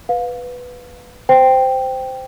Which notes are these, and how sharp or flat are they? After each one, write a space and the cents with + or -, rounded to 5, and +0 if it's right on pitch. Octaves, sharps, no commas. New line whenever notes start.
B4 +0 F5 +25
C5 -15 G5 +0